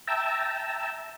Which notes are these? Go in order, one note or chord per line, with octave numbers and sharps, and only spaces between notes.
E5 G5 A5 A#5 E6